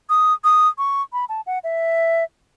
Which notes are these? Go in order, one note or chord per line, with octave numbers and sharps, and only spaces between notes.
D#6
D#6
C#6
B5
A5
F#5
E5